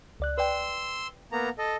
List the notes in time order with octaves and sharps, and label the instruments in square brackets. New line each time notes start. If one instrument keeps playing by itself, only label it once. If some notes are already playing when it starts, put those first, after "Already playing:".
[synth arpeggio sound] C#2 D5 F#6
[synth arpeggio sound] B4 D5 G5 [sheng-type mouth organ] C6 E6
[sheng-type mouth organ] A#3 B3 A#5
A4 D#5